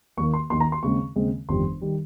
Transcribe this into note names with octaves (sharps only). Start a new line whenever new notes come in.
D#2 D#3 A#3 C#6
C6
D#2 D#3 A#3 C6
A#5
C6
D#2 C#3 G#3 C4 C#6
D#2 C#3 G#3 C4
G1 F2 D#3 G3 C6
D#3 G3